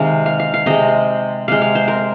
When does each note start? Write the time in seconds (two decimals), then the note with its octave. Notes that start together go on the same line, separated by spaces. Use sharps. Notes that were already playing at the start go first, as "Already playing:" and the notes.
Already playing: C3 D#3 G#3 F5
0.26 F5
0.40 F5
0.54 F5
0.66 C3 G#3 D#5
1.48 C3 G#3 F5
1.62 F5
1.75 C5
1.88 A#4